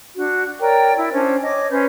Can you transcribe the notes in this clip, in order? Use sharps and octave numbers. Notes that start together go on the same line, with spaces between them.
D4 F#4
A#4 C#5 D5 G5
E4
C#4 D4 C5
C#5 D#5 D6
C#4 B4 C5 G6